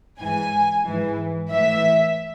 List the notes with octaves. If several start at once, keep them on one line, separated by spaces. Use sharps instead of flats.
G#2 E3 G#5
G#2 E3
A2 E3 E5